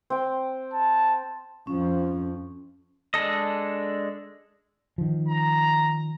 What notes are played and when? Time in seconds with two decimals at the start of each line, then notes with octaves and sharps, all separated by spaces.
0.10 C4 G5
0.73 A5
1.67 F2 F3 C#4
3.14 G#3 D4 A4 D#5
4.98 D#3 F3
5.29 A#5